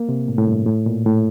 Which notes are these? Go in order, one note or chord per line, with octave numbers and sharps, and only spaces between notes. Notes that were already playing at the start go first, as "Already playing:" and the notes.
Already playing: A#3
C3
A2
A2
G2
A2
A#2
A2